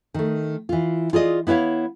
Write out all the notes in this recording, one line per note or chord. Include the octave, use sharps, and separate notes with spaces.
D#3 A3
E3 F4
F4 G#4 D5 D#5
B3 E4 B4 C#5 F5